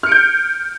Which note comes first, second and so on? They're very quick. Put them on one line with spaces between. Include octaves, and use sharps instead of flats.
F6 C#7 D7 G6